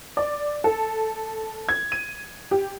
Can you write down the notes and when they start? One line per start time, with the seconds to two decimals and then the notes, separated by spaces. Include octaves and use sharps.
0.17 D5
0.64 A4
1.69 G#6
1.92 D#7
2.51 G4